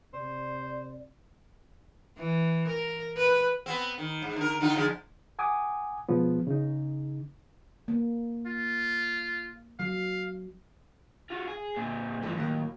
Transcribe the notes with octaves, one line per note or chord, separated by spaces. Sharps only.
C3 C5 D5
E3
A#4
B4
B3 C4
D#3
G#2
D3 A#4
D3 D#4 F4
D3 F3 G#3
F#5 G#5 D6 D#6
B2 F3 G#3 B3
C#3 D#4
A#3
F4
F#3 F5
F4 F#4
G#4
A#2 C4
G2 E3 F3 A3 A4
D#2 A2 F#3 A#3